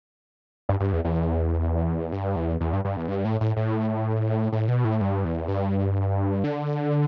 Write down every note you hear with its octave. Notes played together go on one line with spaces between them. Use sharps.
G2
G2
E2
E2
G2
E2
E2
G2
G2
E2
G2
A2
A2
A2
A2
B2
A2
G2
E2
G2
D3